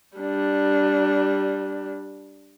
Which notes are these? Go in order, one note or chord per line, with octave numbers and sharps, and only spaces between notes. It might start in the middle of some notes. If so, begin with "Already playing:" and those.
G3 D4